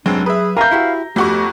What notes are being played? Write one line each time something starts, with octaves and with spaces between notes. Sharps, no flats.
F1 F#3 G#3 C4 D4
G#4 B4 E5
A#4 F5 G#5 A#5 G6
E4 F#4 G4
F2 A3 B3 F#4 G4 C#6